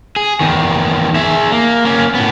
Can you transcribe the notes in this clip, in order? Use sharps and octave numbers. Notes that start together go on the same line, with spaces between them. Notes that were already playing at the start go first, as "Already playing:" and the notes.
G#4
E2 D#3
G#4 E5
A#3
A#3 C#4
A2 B3